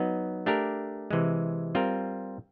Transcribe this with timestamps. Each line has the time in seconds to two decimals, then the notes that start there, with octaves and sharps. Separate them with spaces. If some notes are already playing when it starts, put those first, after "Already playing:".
Already playing: F#3 B3 D#4
0.46 A3 D4 G4 A#4
1.11 C3 E3 G#3
1.75 G3 C4 F4 A#4